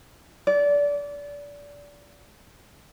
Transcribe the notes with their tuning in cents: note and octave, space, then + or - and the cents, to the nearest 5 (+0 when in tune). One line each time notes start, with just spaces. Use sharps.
D5 -25